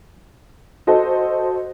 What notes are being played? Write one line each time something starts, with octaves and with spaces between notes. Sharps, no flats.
F#4 A4 C5 D#5